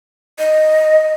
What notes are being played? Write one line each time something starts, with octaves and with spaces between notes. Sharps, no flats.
D#5